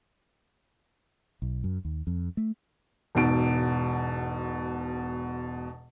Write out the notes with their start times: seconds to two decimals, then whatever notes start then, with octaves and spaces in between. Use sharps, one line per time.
1.42 B1
1.64 F#2
1.85 D#2
2.07 F2
2.37 A3
3.15 E1 G#2 B2 D7